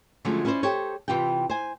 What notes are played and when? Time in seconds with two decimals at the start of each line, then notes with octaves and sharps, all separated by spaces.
0.25 D3 F3 F#3 G#3 A3 C#4
0.45 C#4 E4 A4 B4 C5 D5
0.63 G4 A4 C5 C#5
1.08 C3 E3 F4 G4 G5
1.49 C5 G#5